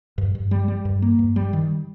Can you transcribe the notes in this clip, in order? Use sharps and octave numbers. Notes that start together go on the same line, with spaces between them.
G2
G2
G3
G3
G2
A#3
G2
G3
D#3